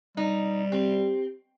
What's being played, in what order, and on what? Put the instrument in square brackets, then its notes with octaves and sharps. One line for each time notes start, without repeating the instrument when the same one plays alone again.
[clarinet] G3 [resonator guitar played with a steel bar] D#4
[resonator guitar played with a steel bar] C4 [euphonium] G4